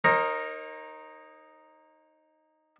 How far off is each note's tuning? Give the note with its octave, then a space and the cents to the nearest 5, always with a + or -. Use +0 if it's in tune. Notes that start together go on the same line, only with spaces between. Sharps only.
D#4 +0 A#4 +0 C#5 -45